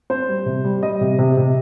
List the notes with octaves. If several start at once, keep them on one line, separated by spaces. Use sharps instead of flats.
C4 C5
G3
C3
G3
G3 D#5
C3
C3
C3